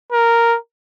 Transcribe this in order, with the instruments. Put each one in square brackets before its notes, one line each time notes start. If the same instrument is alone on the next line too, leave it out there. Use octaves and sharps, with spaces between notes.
[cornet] A#4